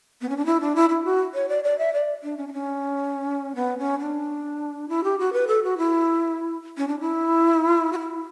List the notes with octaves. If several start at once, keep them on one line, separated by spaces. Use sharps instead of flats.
B3
C#4
D4
E4
D4
E4
E4
F#4
C#5
D5
D5
E5
D5
D4
C#4
D4
C#4
B3
C#4
D4
E4
G4
F#4
B4
A4
F#4
E4
C#4
D4
E4
F#4
E4